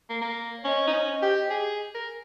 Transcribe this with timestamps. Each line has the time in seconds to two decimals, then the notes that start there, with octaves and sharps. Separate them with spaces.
0.10 A#3
0.21 A#3
0.57 C#5
0.65 C#4 C5 D#5
0.88 D#4
0.93 C#4
1.23 G4
1.51 G#4
1.95 A#4